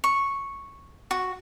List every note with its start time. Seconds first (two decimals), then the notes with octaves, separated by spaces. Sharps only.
0.04 C#6
1.11 F#4